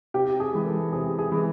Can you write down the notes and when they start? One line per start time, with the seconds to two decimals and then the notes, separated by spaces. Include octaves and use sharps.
0.14 C3 G4
0.40 G#4
0.53 E3 G#3
0.66 A4
0.93 C3 G#4
1.18 G#4
1.32 E3 G#3